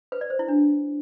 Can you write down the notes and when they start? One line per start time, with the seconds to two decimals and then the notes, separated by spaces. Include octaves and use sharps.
0.12 B4
0.21 D5
0.30 C5
0.39 E4
0.48 D4